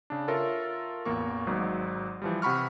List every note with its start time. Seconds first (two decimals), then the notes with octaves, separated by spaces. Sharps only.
0.10 C#3 D4
0.28 F4 A4 A#4 C#5 E5
1.05 A1 E2 A#3 A#4 C#6
1.47 G#1 G#2 F#3
2.22 E3 F3 G3
2.42 C3 F#5 B5 C#6 F6